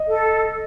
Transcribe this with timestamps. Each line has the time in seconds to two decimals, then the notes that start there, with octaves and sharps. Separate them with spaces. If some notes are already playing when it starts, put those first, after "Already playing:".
Already playing: D#5
0.09 A4